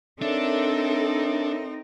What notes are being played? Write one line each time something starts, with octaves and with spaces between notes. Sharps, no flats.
C4 D4 D#4 A4 A#4 C#5 E5